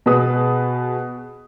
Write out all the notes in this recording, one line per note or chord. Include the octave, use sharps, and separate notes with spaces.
B2 G#4 B4 D#6